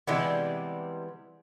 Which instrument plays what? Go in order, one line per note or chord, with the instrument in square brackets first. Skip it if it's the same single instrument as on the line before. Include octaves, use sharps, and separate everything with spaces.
[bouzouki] C3 G3 [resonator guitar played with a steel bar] E3 G#3 B3